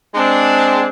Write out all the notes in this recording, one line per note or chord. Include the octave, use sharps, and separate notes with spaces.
G#3 C4 D4